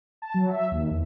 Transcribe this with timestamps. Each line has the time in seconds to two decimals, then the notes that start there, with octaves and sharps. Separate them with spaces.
0.22 A5
0.34 F#3
0.50 E5
0.71 D#2
0.91 E2